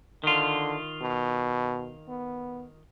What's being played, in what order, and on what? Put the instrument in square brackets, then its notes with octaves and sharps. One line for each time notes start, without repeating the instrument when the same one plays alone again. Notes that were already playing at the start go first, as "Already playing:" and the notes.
[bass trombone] D3 [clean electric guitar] D#3 F4
[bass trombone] B2
B3